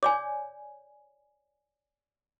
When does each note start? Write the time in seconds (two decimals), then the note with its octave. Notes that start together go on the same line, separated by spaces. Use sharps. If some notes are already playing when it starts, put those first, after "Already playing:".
0.03 C#5 D5 G#5 D6